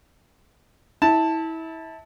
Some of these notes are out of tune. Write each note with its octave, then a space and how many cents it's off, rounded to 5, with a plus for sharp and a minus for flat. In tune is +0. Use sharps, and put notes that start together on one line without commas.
E4 -25 A5 +5